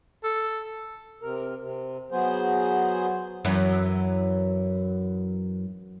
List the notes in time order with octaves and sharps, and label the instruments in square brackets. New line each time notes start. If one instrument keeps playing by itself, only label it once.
[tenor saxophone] A4
[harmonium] C3 A#4
C3
F#3 B3 G#4 C5
[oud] F#2 E3